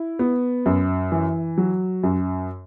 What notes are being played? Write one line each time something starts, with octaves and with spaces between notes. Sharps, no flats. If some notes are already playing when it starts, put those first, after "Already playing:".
Already playing: E4
B3
F#2
E3
F#3
F#2